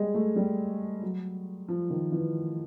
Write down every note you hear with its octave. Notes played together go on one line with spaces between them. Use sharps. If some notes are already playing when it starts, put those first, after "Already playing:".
Already playing: G3 G#3
A3
G3
F#3
F3
D#3
E3